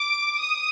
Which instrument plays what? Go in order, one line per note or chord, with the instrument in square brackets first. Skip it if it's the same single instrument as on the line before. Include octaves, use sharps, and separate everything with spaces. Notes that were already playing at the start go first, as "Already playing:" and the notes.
Already playing: [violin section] D6
D#6